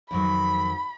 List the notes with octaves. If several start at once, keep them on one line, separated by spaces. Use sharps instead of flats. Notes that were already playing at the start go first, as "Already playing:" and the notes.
F2 D#3 F#3 B5